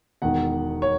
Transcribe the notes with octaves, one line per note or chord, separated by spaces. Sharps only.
E1 E2 D#3 F#5
C#5